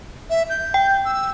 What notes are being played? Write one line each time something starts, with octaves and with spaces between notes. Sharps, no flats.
E5
G6
G5
E6